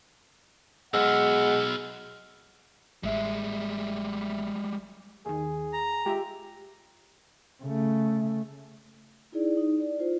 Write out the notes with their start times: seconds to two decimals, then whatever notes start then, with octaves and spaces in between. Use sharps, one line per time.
0.94 B1 B2 G#3 F#5 E6 F6
3.03 A1 G3 G#3 E5
5.26 D#2 D#3 G#4
5.73 A#5
6.06 G#3 F4 G4 E5
7.63 C#3 A3
9.32 D#4 E4 G#4 D5
9.57 D#4
9.80 D5
9.99 F4 C5